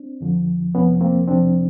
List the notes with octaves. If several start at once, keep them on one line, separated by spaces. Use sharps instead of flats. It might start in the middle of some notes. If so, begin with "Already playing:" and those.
Already playing: C4 D4
F2 D3 F3
F2 C3 F3 B3 C#4
A#3 C4
F2 C3 F3 C4 D4